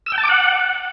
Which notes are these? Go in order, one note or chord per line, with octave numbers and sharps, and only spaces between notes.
E6
G5
A5
D6
F#5